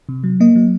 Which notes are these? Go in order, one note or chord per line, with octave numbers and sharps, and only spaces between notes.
C3
F#3
A#3 D#5
F#3